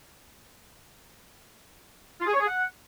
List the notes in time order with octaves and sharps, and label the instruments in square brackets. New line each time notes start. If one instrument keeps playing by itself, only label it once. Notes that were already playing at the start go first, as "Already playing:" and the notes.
[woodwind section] F4
G#4
C#5
G#4
F#5